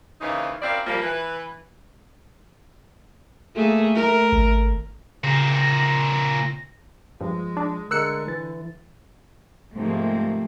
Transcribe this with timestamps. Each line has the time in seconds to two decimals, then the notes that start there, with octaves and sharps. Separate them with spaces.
0.21 D#2 C#3 E3 C4 D#4 F5
0.62 F#2 C4 E4 A#4 D5 F5
0.86 A#2 F3 G3 A#3
1.02 E3 B4
3.55 A3 A#3 G#4
3.95 A3 A#4
4.32 G#1
5.24 A#2 C#3 C4 A#6
6.14 A#6
7.21 G2 F3 G#3
7.57 D4
7.91 D3 G#3 A#4 E6 F#6 C#7
8.28 E3 A6
9.75 G#2 C3 F3 A3 A#3 C4